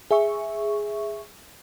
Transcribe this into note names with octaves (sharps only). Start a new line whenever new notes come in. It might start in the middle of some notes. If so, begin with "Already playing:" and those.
G#4 E5 C#6